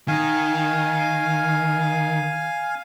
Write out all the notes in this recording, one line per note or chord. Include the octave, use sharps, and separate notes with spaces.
D#3 F5 G#5